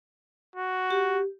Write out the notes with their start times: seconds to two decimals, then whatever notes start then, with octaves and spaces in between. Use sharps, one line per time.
0.56 F#4
0.90 G4